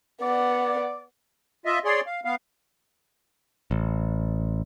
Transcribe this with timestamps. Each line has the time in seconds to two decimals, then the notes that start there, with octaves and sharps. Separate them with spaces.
0.21 B3 D5 F#5
1.66 F4 D#5 E5
1.85 G#4 C#5 D5 C6
2.07 F5
2.25 B3 F5
3.71 A1